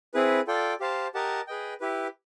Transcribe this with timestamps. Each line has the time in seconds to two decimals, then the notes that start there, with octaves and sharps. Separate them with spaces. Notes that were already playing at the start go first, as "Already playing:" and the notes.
0.14 C4 E4 G#4 B4
0.47 F4 A4 D5 G5
0.80 G4 C5 F5 A5
1.14 G4 A#4 D#5 F#5 A5
1.47 G#4 B4 D#5 G5
1.80 E4 G4 B4